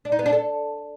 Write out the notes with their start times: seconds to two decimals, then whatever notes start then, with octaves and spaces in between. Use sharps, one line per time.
0.05 D4
0.12 D#4
0.19 B3
0.26 D4
0.33 A4